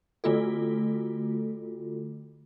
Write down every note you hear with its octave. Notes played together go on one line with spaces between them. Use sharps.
D3 A3 F4 F#4 A4